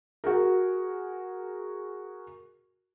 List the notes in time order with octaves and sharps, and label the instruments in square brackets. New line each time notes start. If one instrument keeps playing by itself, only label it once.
[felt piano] F#4 G#4 A#4